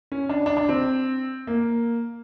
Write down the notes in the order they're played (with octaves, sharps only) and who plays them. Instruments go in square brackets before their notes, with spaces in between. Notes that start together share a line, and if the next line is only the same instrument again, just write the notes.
[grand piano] C#4
D4
D4
D4
C4
A#3